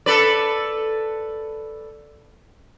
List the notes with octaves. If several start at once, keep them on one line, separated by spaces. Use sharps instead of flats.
A4 B4 D5